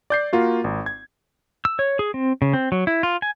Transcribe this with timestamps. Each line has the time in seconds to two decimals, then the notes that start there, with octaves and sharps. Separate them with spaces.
0.10 D5 G6 C7
0.33 A#3 F4 F#4
0.64 G#1
0.86 G#6
1.65 E6
1.79 C#5
1.99 G#4
2.14 C4
2.42 C#3
2.53 C4
2.72 F#3
2.87 E4
3.03 F4
3.22 G#5